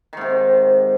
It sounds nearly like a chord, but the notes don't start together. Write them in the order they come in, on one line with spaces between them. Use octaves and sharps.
D#3 G#2 C3